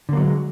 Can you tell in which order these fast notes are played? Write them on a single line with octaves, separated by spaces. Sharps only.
D3 A#3 F#3 G#3